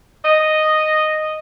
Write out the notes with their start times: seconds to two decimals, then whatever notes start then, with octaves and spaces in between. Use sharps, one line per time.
0.24 D#5